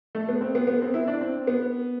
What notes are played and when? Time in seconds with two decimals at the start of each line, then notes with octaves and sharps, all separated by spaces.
0.15 A3
0.29 B3
0.41 C4
0.55 B3
0.67 B3
0.81 C4
0.94 E4
1.07 D4
1.21 C4
1.47 B3